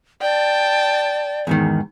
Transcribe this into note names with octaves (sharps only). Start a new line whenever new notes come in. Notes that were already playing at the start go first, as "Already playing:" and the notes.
D5 G5 A5
E2 G#2 D#3